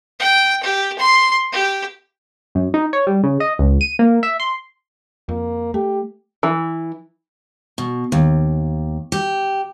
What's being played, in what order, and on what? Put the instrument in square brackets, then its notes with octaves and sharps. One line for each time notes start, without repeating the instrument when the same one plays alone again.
[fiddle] G5
G4
C6
G4
[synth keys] F#2
D#4
C#5
G3
C#3
D#5
C#2
D#7
A#3
E5
C6
[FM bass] F2 [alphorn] A#3
[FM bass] A3 [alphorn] G4
[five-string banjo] E3
[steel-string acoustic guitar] B2
D#2
G4